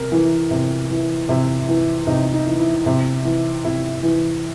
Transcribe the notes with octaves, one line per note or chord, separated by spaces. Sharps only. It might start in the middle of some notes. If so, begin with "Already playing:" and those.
Already playing: C3 A#4
E3
C3
E3
C3 E4
E3
C3 D#4
D#4
E3
E4
C3
E3
C3 E4
E3